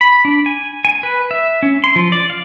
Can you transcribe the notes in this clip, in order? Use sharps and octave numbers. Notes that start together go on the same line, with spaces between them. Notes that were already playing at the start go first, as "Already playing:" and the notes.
B5
D4
G#5
G#5
B4
E5
C#4
C6
F3
D5
F5